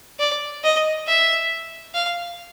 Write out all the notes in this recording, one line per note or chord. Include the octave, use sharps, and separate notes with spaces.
D5
D#5
E5
F5